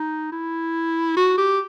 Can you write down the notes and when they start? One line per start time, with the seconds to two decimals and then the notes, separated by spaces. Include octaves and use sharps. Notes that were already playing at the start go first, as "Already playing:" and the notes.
Already playing: D#4
0.32 E4
1.17 F#4
1.38 G4